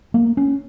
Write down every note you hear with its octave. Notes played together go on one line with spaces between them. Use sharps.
A#3
C#4